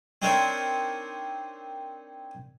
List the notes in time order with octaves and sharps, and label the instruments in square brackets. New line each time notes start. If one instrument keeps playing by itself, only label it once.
[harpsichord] C4 D4 D#4 A#4 C#5